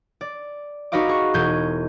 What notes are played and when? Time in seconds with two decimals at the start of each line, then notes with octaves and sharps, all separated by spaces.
0.21 D5
0.92 D#4 F#4 B4 D#5 F5 D6
1.09 G#4 C#6
1.34 E1 G6 G#6 D#7